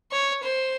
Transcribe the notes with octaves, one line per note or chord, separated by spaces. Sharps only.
C#5
C5